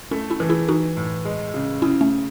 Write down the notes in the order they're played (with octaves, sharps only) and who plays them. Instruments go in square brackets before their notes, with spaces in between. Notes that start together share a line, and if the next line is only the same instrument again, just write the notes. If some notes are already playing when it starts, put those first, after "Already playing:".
[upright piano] A3 [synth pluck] C#4 E4
[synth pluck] C#4 E4
[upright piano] E3
[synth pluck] E4 G#4
[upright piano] E3 [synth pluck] D#4 F#4
[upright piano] A2
G#3
C#3
[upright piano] C#3 [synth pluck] C#4 E4
[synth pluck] A3 C#4